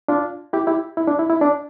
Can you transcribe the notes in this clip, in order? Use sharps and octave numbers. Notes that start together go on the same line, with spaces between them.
D4 F4
E4 G4
E4 G4
E4
D4
E4
E4
D4